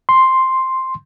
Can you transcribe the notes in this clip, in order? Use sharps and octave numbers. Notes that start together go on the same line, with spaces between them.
C6